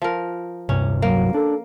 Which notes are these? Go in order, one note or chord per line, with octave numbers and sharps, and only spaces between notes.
F3 A#4
D1 G2 C3 C#4
F#3 A#3
D4 A4